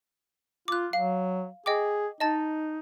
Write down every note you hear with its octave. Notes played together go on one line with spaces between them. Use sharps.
F4 D6 F#6
F#3 F5
G#4 D#5 G5 D6
D#4 D#5 A5 A6